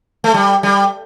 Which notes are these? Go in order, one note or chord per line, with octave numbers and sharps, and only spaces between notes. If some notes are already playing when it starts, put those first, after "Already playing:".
A3
G3
G3